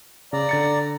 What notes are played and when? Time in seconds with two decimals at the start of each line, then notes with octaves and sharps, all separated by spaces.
0.33 C#3 D5 A#5
0.49 D3 A6 C#7